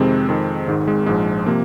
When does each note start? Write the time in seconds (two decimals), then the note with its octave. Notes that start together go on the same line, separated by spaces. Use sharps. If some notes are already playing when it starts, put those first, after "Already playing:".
Already playing: F2 C3 D#3 G#3 C4
0.28 F2 D#3
0.67 G#1 G#2 D#3
0.88 G#3
1.06 A#1 G#2 F3 G#3
1.46 C3 F3 A#3